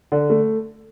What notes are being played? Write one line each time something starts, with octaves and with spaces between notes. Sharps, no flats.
D3
A3